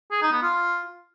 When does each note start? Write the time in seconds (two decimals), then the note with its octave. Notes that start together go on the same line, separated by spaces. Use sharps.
0.11 G#4
0.22 D#4
0.32 B3
0.43 F4